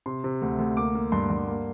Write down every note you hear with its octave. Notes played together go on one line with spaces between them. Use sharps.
C3 C6
C3
D2
D2
A#3 D6
A#3
G2 C6
G2
A#3